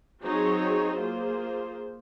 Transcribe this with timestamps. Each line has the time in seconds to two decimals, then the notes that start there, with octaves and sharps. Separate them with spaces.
0.24 F#3 C4 D#4 G#4 C#5
0.99 A#3 F4 G#4 C5